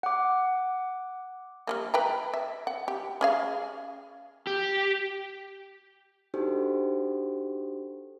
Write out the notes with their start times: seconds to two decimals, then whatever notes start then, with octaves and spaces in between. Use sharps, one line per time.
0.03 F#5 D6
1.67 G3 G#3 A#3
1.94 B4 G5 A#5
2.34 E5
2.67 F#5
2.88 G4
3.21 C#4 G#4 F5
4.47 G4
6.34 D4 D#4 F#4 G4 A4 C5